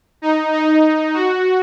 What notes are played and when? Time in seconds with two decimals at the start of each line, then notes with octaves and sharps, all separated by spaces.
0.22 D#4
0.53 D#4
1.14 F#4